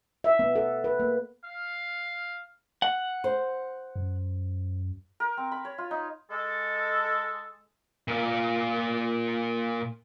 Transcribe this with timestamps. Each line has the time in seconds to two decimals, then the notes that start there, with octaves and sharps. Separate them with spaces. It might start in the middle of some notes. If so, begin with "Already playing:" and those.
0.24 E5
0.39 B3
0.56 A4
0.84 B4
1.00 A#3
1.45 F5
2.82 F#5
3.24 C5
3.96 F#2
5.20 A#4
5.37 C4
5.52 B5
5.65 C#5
5.78 F4
5.91 D#4
6.31 G#3 A4
8.08 A#2 F4